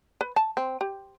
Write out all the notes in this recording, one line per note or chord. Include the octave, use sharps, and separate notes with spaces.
B4
A5
C4
G4